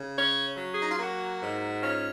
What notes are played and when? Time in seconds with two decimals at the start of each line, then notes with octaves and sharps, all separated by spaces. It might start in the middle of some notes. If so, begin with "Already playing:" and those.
Already playing: C#3
0.17 C#4 C#5
0.58 F#3
0.72 G#4
0.82 D#4
0.91 F4
0.99 A#3 F#4
1.42 G#2
1.82 C#4 F4